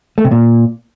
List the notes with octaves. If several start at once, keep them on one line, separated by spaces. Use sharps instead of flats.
A3
C3
A#2